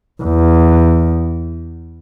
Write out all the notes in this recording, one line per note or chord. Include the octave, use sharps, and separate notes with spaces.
E2